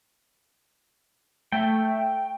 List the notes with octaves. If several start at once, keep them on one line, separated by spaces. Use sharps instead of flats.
A3 G5